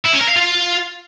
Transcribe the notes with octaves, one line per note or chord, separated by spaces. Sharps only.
E4
C#4
A#4
F5
F4